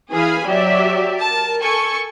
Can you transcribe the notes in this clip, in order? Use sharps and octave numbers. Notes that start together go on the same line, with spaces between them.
E3 G#4 F5 G#5 B5
F#3 G4 D5 E5
A#4 A5
A4 G#5 C#6